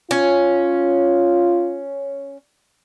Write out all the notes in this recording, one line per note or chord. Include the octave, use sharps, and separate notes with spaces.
C#4 F4